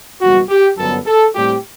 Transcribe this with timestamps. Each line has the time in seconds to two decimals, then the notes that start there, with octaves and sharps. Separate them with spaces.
0.21 F#1 E2 B2 G3 F#4
0.49 G4
0.78 G1 F#2 D3 F#3 B3 A4
1.06 A4
1.35 A2 G3 C4 G4